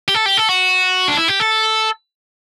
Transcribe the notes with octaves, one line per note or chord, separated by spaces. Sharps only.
G4
A4
G4
A4
F#4
D4
E4
G4
A4